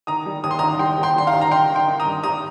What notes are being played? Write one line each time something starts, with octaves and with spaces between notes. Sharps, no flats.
D#3 A#5 D#6
G3
D#2 D#6
C6
D#3 A#5 D#6
G3 G5 C6
D#2
G5 C6
G3 C6
F5 A#5
D#3
A#5
D#4 G5 C6
D#3
G5 C6
D#3
A#5 D#6
G2
G3 A#5 D#6